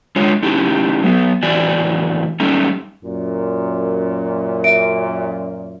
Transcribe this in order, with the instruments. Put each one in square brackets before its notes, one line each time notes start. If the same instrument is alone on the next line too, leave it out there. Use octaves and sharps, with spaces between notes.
[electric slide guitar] G#3 D4 F4 C#5
A3 C#4 D#4 E4 G4
F#3 B3
F2 A2 E3 F#4 D5 G#5
G3 A3 C#4 D#4
[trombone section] F#2 A#2
[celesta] E5 D7